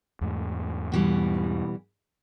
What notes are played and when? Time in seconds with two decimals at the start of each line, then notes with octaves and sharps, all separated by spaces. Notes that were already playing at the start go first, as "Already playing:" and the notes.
0.21 E2 G#2 A3
0.92 B2 E3 G3